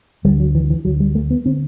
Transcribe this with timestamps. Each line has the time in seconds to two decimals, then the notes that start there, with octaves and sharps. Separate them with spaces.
0.24 D2 D3 G3
0.40 F#3
0.55 E3
0.70 E3
0.85 D2 D3 F#3
1.00 G3
1.15 A3
1.30 B3
1.46 D3 C4